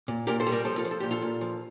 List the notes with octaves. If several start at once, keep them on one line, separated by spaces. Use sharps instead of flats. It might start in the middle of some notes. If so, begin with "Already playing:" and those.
A#2
A#2 G4 A#4
A4 C5
G3
A#4 D5
F3 A4 C5
F4 A4
F3
A4
A#2 G4
F4 A4
A#2
F3